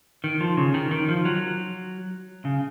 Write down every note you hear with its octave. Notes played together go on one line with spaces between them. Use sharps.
D#3
F3
C#3
D#3
D#3
F3
F#3
C#3